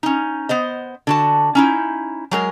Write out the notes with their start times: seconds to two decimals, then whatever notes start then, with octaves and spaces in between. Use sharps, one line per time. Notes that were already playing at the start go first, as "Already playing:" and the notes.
0.03 C#4 D#4
0.49 B3 C5 D#5
1.07 D3 F#4 A5
1.55 C#4 D#4 E4
2.31 F#3 G#3 A#4